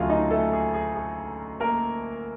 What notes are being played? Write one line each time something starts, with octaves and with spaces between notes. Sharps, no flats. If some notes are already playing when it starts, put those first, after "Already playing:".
Already playing: D2 C#3 F#3 A3 F4 G#4 F5 G#5
D#4 D#5
A3 A4
G#4
G#4
G#4
A#3 A#4